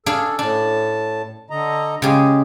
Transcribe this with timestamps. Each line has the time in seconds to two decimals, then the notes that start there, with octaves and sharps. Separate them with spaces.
0.06 D4 G#4 A4 F5
0.39 A2 D4 A5
1.50 D3 D#5 A#5
2.02 C#3 G#3 G4 G#4